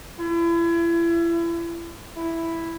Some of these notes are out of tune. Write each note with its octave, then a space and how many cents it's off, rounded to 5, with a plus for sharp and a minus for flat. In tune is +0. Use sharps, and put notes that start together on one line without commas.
E4 +35
E4 +5